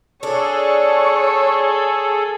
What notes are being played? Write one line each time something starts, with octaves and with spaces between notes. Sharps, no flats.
D4 G#4 A4 C#5